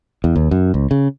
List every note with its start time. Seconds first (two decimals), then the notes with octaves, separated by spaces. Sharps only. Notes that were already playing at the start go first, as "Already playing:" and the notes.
0.24 E2
0.36 D#2
0.51 F#2
0.74 C#2
0.91 C#3